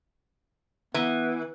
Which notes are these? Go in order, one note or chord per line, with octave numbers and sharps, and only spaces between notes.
E3 B3